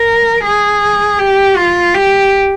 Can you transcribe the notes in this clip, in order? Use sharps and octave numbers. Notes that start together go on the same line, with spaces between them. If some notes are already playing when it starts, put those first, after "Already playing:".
Already playing: A#4
G#4
G4
F4
G4